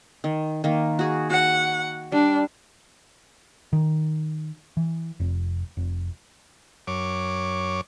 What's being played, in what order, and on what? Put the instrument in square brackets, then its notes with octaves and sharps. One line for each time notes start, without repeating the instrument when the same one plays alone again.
[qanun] D#3
D#3 A#3
F#4 G#4
[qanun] F#4 [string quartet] F#5
[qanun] G3 [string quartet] D4
[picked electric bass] D#3
E3
F1
F1
[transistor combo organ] F#2 C#5 D6